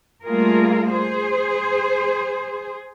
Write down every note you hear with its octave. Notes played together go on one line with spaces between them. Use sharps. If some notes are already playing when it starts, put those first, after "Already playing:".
G3 A3 A#3 F4 G#4 A#4
G#4 C5